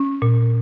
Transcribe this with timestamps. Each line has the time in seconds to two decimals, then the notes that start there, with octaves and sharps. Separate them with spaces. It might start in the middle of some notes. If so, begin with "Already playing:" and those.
Already playing: C#4
0.22 A#2